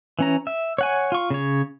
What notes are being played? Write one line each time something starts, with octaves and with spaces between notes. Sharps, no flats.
E3 C#4 A#5
E5
C#5 F#5 G#5
F4 C#6
C#3 C#5